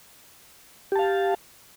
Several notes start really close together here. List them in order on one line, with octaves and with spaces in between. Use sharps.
G4 A5 F5